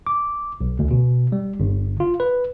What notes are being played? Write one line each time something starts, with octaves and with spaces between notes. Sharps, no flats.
D6
B1
D2
B2
G3
G1
F4
B4